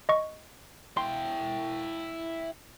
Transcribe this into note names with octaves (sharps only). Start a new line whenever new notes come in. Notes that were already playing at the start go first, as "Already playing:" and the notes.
D#5 C#6
E4 G5 C6